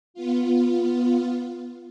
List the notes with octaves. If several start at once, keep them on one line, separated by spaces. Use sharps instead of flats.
B3 F4